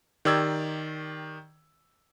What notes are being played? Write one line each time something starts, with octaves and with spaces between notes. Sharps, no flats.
D#3 G4 D5 E6 G#6